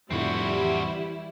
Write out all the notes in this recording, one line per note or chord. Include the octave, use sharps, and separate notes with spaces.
F1 F2 A2 D3 G3 C4 E4 F#4
E3